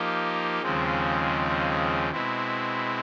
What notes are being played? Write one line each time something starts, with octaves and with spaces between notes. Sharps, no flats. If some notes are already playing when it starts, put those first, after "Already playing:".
Already playing: F3 A#3 D#4 G4
D#2 C#3 F3 G#3 C4
B2 G#3 C4 E4